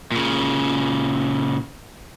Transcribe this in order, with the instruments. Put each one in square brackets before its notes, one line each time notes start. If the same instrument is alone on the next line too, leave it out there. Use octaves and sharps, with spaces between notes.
[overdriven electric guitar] A#2 C#3